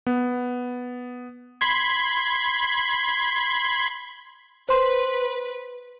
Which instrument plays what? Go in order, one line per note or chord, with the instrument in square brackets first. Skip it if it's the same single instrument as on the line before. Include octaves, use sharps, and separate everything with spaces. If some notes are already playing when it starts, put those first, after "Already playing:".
[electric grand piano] B3
[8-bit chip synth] B5 C6 G#6
[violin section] B4 [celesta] C5 C6